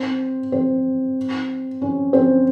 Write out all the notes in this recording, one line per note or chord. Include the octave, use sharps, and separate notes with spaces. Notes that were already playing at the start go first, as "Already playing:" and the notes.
Already playing: C4
C4
C#4
C4